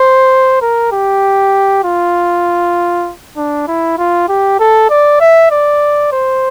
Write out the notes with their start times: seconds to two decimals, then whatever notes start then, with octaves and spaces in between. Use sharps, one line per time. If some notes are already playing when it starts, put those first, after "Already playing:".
Already playing: C5
0.62 A#4
0.92 G4
1.84 F4
3.37 D4
3.67 E4
3.98 F4
4.29 G4
4.59 A4
4.90 D5
5.20 E5
5.51 D5
6.12 C5